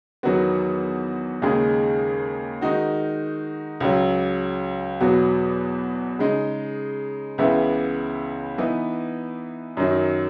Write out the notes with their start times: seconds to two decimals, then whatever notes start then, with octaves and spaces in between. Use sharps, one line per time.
0.23 E2 D#3 F#3 B3 F#4
1.42 D#2 C#3 G#3 D#4 G#4
2.61 D#3 G#3 D#4 F#4
3.80 C#2 C#3 F#3
5.00 E2 B2 F#3 B3 F#4
6.19 C#3 G#3 D#4
7.38 C#2 C#3 E3 B3 E4
8.58 E3 B3 D#4
9.77 F#2 D#3 F#3